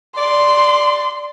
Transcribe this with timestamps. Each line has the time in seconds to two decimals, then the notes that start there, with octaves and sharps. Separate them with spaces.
0.17 D5 C6